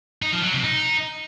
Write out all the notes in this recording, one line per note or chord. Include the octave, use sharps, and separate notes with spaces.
D#4
F3
F#3
C3
D#4